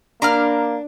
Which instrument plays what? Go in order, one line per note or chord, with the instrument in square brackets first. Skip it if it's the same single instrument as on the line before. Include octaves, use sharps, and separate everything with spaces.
[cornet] A#3 [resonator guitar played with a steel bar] D4 [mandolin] A#5 B5 F6